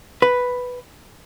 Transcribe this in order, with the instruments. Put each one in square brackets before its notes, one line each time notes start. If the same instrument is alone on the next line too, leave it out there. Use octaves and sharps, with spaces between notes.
[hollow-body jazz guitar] B4